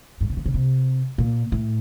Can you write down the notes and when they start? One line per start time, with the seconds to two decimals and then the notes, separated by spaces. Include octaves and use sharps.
0.21 G2
0.30 C#3
0.37 D3
0.46 C#3
0.54 C3
1.18 A#2
1.52 A2